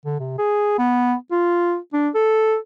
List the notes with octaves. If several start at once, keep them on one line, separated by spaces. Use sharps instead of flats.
D3
C3
G#4
B3
F4
D4
A4